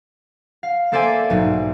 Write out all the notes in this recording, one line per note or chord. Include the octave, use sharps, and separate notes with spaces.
F5
A#3 A4 C5 D5 E5 G#5
B1 G#2